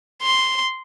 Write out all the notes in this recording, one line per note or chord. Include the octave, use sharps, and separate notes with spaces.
C6